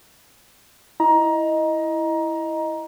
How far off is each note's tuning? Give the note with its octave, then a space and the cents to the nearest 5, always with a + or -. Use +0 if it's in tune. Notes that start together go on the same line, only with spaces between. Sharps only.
E4 +0 D#5 +0 A#5 +20